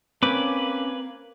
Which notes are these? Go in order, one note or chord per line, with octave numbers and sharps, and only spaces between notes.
A#3 C4 C#4 B4 D6